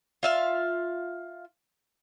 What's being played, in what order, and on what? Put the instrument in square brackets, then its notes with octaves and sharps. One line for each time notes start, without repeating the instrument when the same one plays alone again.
[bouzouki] F4 E5 F5